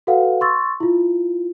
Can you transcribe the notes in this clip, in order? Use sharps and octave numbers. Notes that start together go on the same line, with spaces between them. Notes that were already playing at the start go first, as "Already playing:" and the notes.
F#4 A4 B4 F5 F#5
C6 C#6 E6 A6
E4 F4